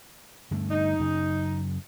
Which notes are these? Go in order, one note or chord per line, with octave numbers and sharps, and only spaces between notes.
G2 D3 A3
D#4
F#2 C#3